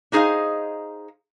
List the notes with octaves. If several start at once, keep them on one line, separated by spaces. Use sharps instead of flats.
D4 D#4 G#4 C5 D#5 F5